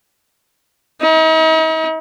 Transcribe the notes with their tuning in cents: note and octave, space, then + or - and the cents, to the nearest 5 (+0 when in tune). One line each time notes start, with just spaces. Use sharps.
D#4 +45